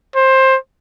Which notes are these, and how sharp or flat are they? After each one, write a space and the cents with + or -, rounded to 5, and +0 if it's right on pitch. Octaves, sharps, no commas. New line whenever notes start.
C5 +15